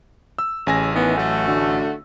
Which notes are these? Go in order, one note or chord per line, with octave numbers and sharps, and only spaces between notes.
E6
A1 C#3 G#5 A#6
D#3 E3 B3
F#3 A3 F#4
D3